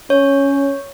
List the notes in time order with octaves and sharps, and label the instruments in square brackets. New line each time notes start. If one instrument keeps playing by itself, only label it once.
[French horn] C#4 [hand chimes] C#5